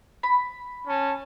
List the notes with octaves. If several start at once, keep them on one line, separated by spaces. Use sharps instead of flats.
B5
C#4 A5